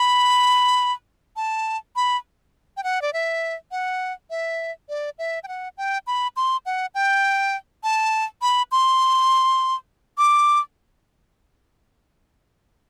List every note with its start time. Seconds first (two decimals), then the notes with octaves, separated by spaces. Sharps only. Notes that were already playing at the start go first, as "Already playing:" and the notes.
Already playing: B5
1.36 A5
1.96 B5
2.77 G5
2.84 F#5
3.02 D5
3.13 E5
3.71 F#5
4.30 E5
4.89 D5
5.19 E5
5.43 G5
5.48 F#5
5.78 G5
6.07 B5
6.36 C6
6.66 F#5
6.95 G5
7.84 A5
8.42 B5
8.72 C6
10.18 D6